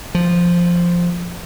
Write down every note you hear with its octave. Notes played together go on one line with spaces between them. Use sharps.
F3